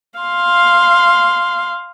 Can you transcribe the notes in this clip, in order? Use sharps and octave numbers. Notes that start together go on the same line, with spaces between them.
F5 C6